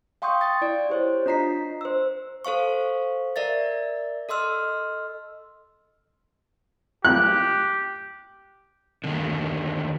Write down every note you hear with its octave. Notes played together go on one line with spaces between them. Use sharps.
F5 G5 C6 C#6 D#6 G6
G5 A6
E4 D5 D7
G4 C5 C#5
D4 F4 D#5 A#5 B6 C7
C5 E6
A4 C5 F5 C#6
A#4 D5 E5 A6
A4 D#5 C6 E6 F6
G4 F#6
D3 D#3 G#3 A#3